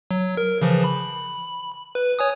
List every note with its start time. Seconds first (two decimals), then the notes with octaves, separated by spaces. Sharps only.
0.11 F#3
0.37 A#4
0.62 C#3 E3 F3
0.84 B5
1.95 B4
2.19 C#5 G#5 D#6